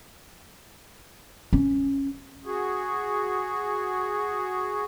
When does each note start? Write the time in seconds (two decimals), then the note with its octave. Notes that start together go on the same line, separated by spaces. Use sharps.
1.53 C#4
2.45 F#4 G#4